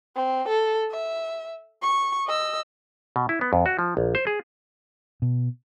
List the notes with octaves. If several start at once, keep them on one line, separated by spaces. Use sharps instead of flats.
C4
A4
E5
C#6
D#5 E6
B2
E4
B3
F2
F#4
F3
A#1
C5
G#4
B2